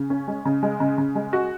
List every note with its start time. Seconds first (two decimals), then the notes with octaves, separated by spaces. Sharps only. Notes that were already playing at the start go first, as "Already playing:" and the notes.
Already playing: C#3
0.10 C#4
0.28 G#3
0.45 C#3
0.63 G#3
0.80 C#3
0.98 C#3
1.15 G#3
1.33 F#4